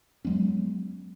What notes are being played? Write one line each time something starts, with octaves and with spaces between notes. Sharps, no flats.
F#3 G#3 B3 C#4